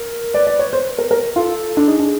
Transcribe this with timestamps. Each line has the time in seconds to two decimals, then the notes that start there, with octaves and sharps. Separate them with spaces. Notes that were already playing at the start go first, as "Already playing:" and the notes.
Already playing: A#4
0.34 B4 D5
0.47 D5
0.59 C#5
0.73 C5
0.98 A#4
1.11 A#4
1.36 F4 A4
1.77 D4
1.87 D#4 G#4
2.00 D4